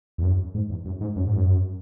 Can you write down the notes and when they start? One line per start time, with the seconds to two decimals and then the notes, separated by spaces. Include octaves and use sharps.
0.18 E2
0.24 F#2
0.54 G#2
0.70 E2
0.86 F#2
1.01 G#2
1.16 F#2
1.27 G#2
1.36 F#2